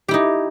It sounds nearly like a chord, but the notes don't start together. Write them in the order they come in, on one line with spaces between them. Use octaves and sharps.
G4 E4 D#4